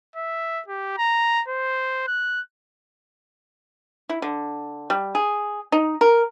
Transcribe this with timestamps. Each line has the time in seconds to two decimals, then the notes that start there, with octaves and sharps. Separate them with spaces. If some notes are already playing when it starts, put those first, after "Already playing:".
0.16 E5
0.68 G4
0.98 A#5
1.48 C5
2.08 F#6
4.09 E4
4.22 D3
4.90 G3
5.15 G#4
5.72 D#4
6.01 A#4